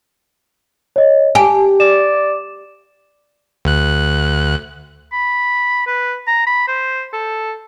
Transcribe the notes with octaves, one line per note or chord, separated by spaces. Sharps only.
C#5 D#5
G4 G#5 A5
D5 E7
D2 F#6
B5
B4
A#5
B5
C5
A4